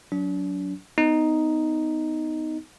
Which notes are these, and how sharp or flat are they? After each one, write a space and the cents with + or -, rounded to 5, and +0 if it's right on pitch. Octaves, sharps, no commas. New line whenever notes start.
F#3 +0 D4 -40
B3 +25 D#4 +0